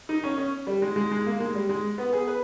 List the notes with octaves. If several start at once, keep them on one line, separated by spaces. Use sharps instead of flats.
D#4
C#4
C#4
G3
G#3
G#3
G#3
A#3
G#3
G3
G#3
B3
G#4
B4